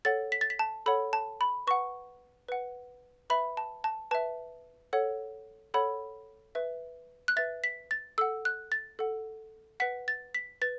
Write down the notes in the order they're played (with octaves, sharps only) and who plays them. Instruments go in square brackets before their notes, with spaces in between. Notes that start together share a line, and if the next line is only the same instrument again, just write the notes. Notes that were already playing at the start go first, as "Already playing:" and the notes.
[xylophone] A4 C#5 F#5 A6
B6
A6
B6
A5
A4 C#5 F#5 B5
A5
B5
B4 F#5 C#6
B4 F#5
B4 E5 B5
A5
A5
B4 E5 A5
A4 C#5 F#5
A4 C#5 F#5 B5
B4 E5
F#6
B4 E5 A6
B6
A6
A4 F#5 E6
F#6
A6
A4 F#5
B4 F#5 B6
A6
B6
B4 A6